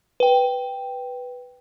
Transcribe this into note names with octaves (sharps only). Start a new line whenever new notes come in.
B4 G5